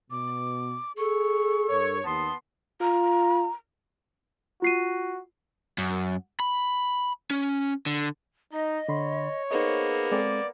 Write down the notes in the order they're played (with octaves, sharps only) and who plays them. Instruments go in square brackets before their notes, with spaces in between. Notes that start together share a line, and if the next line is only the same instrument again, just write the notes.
[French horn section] B2 [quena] D6
[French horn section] G#4 [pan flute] A4 [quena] C#6
[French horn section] G2 A#4 [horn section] C#5
[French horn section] D#2 [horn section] B3 A5 C6 [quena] D#6
[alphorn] F4 [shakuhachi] A#5
[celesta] F4 C7 D#7 [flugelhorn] F#4
[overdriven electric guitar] F#2
B5
C#4
D3
[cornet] D#4 [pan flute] D#5
[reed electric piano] D3 B5 C6 [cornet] C#5
[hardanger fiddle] A#3 B3 [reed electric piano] D#4 C5 D#5 [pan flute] G#4
[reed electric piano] G#3 C4 A4 [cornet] D5